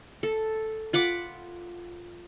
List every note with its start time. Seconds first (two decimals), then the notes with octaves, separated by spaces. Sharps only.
0.23 A4
0.93 F4 F#5 B5 D6